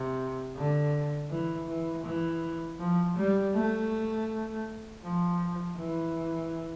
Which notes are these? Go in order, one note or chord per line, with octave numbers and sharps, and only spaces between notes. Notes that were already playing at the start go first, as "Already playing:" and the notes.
Already playing: C3
D3
E3
E3
E3
F3
G3
A3
F3
E3